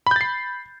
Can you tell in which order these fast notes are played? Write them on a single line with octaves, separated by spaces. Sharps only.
B5 G6 A6 C7